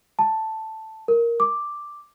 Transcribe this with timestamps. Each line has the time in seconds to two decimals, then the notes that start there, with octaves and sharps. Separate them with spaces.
0.19 A5
1.08 A#4
1.40 D6